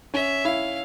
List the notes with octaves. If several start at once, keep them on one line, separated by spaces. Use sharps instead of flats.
C#4 E5
E4 F5